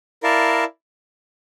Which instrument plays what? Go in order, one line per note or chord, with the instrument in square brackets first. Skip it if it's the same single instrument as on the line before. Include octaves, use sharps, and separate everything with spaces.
[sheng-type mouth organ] E4 A#4 D5 F5 A5